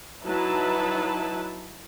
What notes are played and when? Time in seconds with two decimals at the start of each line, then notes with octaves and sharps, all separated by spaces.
0.24 F#3 D#4 E4 B4 A5